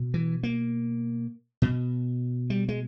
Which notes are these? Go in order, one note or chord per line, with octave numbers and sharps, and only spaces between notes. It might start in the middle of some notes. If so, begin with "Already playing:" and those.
Already playing: B2
E3
A#3
B2
G3
G#3